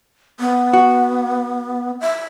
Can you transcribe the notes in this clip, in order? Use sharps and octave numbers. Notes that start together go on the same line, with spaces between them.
B3
F#4
E5